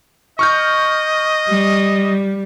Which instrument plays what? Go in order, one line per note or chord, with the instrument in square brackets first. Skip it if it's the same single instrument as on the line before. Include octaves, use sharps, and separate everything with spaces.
[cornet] D#5 [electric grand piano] C#6 F6 G6
[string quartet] G3